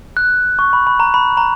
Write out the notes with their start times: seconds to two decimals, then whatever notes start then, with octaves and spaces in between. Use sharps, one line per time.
0.17 F#6
0.59 C#6
0.73 B5
0.87 B5
1.00 A#5
1.14 B5
1.37 A#5